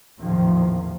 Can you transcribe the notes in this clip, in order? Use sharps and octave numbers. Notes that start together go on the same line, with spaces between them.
A1 E2 A#2 D#3 F3